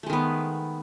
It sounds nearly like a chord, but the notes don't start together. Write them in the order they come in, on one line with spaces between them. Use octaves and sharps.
A3 G#3 D#3 B3